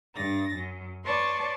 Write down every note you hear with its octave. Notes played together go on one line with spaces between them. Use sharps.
G2 A6 A#6
F#2
B4 C#5 D5 A5 C6 C#6